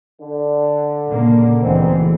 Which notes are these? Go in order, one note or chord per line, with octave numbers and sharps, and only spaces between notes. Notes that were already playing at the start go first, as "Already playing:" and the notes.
D3
A#2 C#3 A#3
D2 G#2 E3 B3 C4